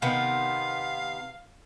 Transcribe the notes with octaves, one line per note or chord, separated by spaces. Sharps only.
C3 D#3 B3 F5